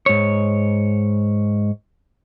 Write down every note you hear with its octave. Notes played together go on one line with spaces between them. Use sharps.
G#2 C#5